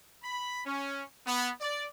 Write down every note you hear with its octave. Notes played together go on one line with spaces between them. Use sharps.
B5
C#4
B3
D5